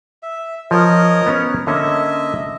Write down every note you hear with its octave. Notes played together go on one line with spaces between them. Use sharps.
E5
F3 A#4 C#5 D#5
B3 C#4 A#5
D3 A#3 C#4 D#5 E5